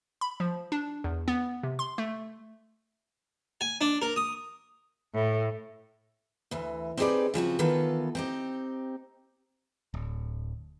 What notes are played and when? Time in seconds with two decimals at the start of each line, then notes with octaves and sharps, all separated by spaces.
0.21 B5
0.40 F3
0.72 D4
1.04 E2
1.28 B3
1.63 C3
1.79 C6
1.98 A3
3.61 G#5
3.81 D4
4.02 A#4
4.16 D#6
5.15 A2
6.51 D2 E3
6.97 C4 D#4 G4 G#4 B4 D5
7.34 C#3 F3 C4 F#4
7.59 D#3 E3 B3 F4 A4
8.15 C4 D#4 G4
9.94 D1